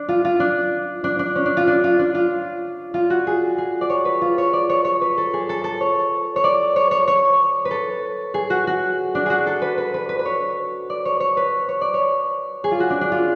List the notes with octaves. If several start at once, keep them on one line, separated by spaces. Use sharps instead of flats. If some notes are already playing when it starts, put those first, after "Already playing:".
Already playing: D4
F4
F4
D4
D4
D4
C#4
D4
F4
D4
F4
D4
F4
F4
F#4
G#4
G#4
D5
C#5
B4
F4
C#5
D5
C#5
C#5
B4
A4
G#4
A4
A4
C#5
C#5
D5
C#5
C#5
C#5
B4
A4
G#4
F#4
F#4
D4
F#4 G#4
A4
B4
B4
B4
B4
B4
C#5
D5
C#5
C#5
B4
C#5
D5
C#5
G#4
F4
F#4
D4
D4
F4